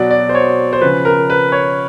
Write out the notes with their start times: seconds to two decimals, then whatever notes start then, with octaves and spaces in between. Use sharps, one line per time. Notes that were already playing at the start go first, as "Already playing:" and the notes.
Already playing: B2 F#3 D5
0.10 D5
0.29 C5
0.35 C#5
0.73 C5
0.81 C#3 F3 B4
1.05 A#4
1.30 B4
1.52 C#5